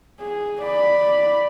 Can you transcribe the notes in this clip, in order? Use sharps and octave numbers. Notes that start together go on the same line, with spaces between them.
G#4
D5 B5